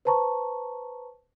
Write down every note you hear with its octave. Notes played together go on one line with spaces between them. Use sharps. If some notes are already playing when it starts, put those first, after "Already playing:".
B4 C5 A5 A#5 C#6